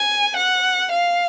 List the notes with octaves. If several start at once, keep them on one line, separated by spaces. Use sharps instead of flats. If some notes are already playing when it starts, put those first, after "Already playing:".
Already playing: G#5
F#5
F5